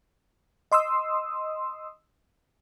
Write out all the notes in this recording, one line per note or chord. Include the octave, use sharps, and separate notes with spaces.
D#5 C6 D#6 E6